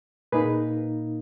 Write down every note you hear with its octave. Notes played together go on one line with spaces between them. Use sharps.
A#2 A#3 D#4 G#4 B4